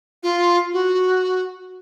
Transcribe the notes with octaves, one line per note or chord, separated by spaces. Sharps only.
F4
F#4